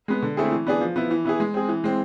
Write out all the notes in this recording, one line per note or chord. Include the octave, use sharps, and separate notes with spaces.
G#3 B3
D3
A3 C4 E4 G#4
E3
B3 D4 G#4
F3
B3 E4
E3
B3 E4 G#4
G#3
C4 G#4
E3
G#3 C4